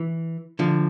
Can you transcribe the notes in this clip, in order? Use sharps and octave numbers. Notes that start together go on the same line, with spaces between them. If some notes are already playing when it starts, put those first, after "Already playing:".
Already playing: E3
D3 F3